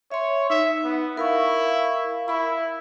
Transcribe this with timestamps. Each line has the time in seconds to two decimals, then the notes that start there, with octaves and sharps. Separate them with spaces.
0.12 C#5 E5 C6
0.50 D#4 E5
0.84 B3
1.17 E4 A#4 F5 C#6
2.28 E4 B5